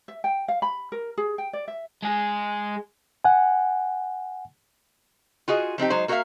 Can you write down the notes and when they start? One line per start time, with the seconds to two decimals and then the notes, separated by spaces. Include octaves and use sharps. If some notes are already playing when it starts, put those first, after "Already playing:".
0.08 E5
0.24 G5
0.48 F5
0.62 B5
0.92 A#4
1.18 G#4
1.38 G5
1.53 D5
1.68 E5
2.02 G#3 G#4
3.24 F#5 G#5
5.48 F4 F#4 G#4 D#5
5.78 F3 C4 D#4 G4
5.90 F#3 G#3 D#4 C5
6.08 A#3 F#4 A#4 D5 E5 F5